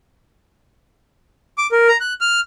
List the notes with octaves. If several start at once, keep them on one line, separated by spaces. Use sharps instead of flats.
D6
A#4
A#5
F#6
F6